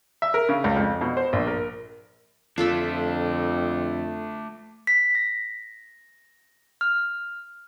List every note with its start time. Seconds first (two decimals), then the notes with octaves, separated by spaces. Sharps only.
0.22 E5
0.34 A#4
0.49 C#3
0.64 C#2
0.76 F2
1.01 B2
1.17 C5
1.33 A#1
1.47 A#4
2.58 F2 A3 D4 F4 A4 E5
4.87 B6
5.15 A#6
6.81 F6